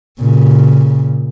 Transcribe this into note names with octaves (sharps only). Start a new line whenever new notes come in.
A#2 C#3